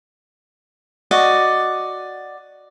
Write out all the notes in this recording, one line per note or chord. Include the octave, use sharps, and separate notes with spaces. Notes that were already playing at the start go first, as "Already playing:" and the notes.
F#4 D5 D#5